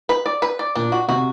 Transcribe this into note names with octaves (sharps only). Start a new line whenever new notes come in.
B4
D5
B4
D5
A#2 D4
F#4
C3 F#4